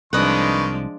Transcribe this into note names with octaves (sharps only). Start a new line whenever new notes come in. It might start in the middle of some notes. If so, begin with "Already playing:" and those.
C2 D#3 F3 G#3 D4 B4 D#5 C#6